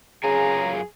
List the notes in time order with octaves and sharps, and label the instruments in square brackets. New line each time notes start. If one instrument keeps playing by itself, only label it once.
[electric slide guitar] F#2 F4 G#5 [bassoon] C#3 [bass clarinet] G#4 [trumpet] A#5